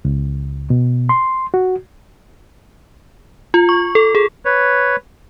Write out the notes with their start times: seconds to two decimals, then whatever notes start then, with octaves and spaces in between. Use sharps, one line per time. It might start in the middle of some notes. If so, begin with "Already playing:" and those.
0.05 C#2
0.70 B2
1.09 C6
1.54 F#4
3.54 F4
3.69 C#6
3.95 A4
4.15 G#4
4.45 B4 C#5